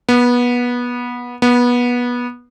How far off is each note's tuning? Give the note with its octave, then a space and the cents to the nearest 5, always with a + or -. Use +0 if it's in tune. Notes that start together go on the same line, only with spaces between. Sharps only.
B3 -20
B3 -20